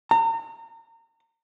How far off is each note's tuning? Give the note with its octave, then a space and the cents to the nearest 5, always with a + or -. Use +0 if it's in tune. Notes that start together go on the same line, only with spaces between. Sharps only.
A#5 -35